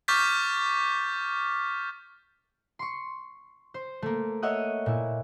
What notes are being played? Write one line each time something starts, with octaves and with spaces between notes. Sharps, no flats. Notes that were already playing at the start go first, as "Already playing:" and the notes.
C#6 D6 F6 G6 A6 B6
C6 C#6
C5
A3 A#3
C#5 D#5 E5 F#5 D#6
A#2 E4